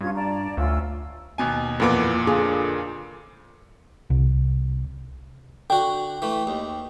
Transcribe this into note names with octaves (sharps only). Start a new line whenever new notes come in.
G2 C#4 F4 G#6
D5 A5 A#5
D2 C#4 F4 E6
D#2 B2 G#5
F2 A#2 E3 B3 D6
D3 F4 G#4
C2
D3 F#4 G5
E3 A3
D#2